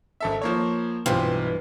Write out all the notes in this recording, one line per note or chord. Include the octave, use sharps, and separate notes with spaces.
G#1 A4 E5
F3 A#3 C#5
B1 G2 E3 C4 F4